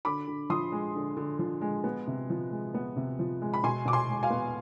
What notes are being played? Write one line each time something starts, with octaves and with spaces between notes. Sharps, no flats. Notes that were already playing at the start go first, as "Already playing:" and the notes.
D3 B5 D6
D3
F3 C6 D#6
G#3
D3
D3
F3
G#3
B3
C3
F3
G#3
B3
C3
F3
G#3
B5
B2 G#5 C6
B2 D6
G#5 C6
G#3
F5 G#5
B3